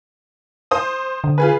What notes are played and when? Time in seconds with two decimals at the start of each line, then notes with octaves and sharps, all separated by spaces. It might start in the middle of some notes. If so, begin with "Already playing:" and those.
0.71 C5 D#6
1.24 D3
1.38 F4 G#4 B4